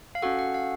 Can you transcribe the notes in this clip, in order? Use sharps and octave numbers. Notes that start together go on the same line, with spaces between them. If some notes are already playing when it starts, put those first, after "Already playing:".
F5
C#4 F#4 A4 F#5
F#5
F5